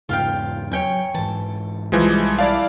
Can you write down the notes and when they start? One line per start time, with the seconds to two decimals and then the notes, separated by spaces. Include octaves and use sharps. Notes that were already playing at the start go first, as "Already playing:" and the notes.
0.09 E2 G#2 C#3 F4 F5 G5
0.71 F#3 C#5 G5 G#5
1.14 G#2 E3 A5
1.92 B1 E3 F3 G3 G#3
2.38 E4 D5 F5 A5